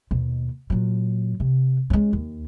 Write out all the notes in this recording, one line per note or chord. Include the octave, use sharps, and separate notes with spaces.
D#2 B2
A#2 F#3
C3
G#3 C#4
D#2